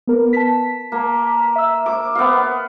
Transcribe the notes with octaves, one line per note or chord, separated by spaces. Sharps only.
B3 A#4 B4
A5 B6
A#3
E5 E6
D6
B3 F5